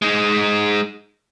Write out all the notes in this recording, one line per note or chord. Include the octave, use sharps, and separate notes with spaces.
G#3 D#4